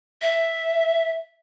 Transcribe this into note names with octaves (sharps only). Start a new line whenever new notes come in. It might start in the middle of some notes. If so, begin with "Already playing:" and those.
E5